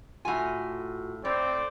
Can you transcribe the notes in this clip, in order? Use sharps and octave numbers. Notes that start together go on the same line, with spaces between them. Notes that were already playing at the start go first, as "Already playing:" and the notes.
A2 F4 F#4 G#5
A2 C4 D5